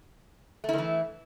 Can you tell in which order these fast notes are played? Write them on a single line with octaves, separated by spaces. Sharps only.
A3 E4 D#3 E3